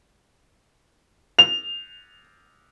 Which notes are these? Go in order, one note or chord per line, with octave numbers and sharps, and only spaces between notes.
F7